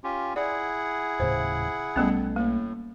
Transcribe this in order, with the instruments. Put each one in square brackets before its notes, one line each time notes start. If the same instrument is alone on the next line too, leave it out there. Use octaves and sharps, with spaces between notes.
[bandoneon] C#4 F4 G4
[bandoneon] E4 G#4 F#5 [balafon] D5
[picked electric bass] D#1 A2 C#3 [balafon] C5
[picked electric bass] B1 A3 [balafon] G3 B3 C#4
[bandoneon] A2 [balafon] A#3